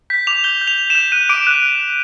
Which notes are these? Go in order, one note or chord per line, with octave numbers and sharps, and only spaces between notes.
G6 B6
D6 F7
G6 G7
G6
F7
G6
E7
G6
F#6 D#7
D6 D7
F#6